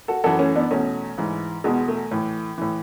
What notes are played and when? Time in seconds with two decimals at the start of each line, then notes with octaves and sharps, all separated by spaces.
0.08 F#4 A4
0.24 F#2 E3 F#4 A4
0.39 A3 C#4
0.55 B3 D4
0.71 E2 B2 A3 C#4
1.18 G#2 E3
1.64 E2 B2 G#3 B3
1.88 A3
2.11 A2 E3
2.58 A2 E3